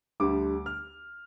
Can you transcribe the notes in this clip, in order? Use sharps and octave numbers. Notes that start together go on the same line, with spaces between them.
D2 D3 G3 D6
F6